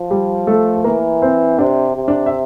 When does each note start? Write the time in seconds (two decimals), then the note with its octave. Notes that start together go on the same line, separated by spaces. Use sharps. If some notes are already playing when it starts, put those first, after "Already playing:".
Already playing: F3
0.11 G3 G4
0.47 A3 A4
0.77 A4
0.84 E3 A#3 A#4
1.22 C4 C5
1.59 C3 D4 D5
1.96 C3
2.08 D4 D5
2.26 E5